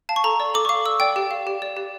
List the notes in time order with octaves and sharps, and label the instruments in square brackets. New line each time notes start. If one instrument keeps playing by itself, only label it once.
[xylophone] F5 A5
C#6
A4 A#5
D5
A4 D6
C#6
F5 D6
A4 E6
D5 G5
G4
F5
G4
D5
G4